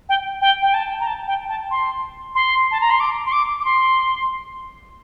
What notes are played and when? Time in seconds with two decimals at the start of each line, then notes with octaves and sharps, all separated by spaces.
0.09 G5
0.41 G5
0.62 G5
0.74 A5
1.00 A#5
1.06 A5
1.27 G5
1.49 A5
1.71 C6
2.35 C6
2.71 A5
2.81 A#5
2.91 C6
3.00 D6
3.26 C6
3.32 D6
3.60 D6
3.65 C6